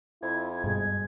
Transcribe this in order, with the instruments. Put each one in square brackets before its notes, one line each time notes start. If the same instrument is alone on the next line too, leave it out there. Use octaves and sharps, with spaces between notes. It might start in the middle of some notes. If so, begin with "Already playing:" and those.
[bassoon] F2 [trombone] E4 [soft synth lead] G#6
[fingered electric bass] G2 B2 [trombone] G#3